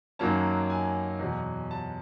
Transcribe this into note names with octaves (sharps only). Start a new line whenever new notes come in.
F#2 D#3 F#3 A#3 C#4 A5
G#5
E2 B2 F#3
A5